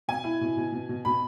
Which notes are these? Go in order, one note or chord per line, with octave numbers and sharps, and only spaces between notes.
B2 G#5
E4
B2
B2
B2
B2
B2 B5